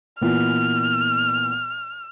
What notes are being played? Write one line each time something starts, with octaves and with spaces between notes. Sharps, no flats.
A#2 E3 B3 F6